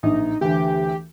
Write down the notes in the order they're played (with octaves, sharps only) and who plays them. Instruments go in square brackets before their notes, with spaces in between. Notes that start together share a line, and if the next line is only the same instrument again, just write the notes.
[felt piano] A#1 [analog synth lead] D#4
[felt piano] D2 E3 [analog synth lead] G4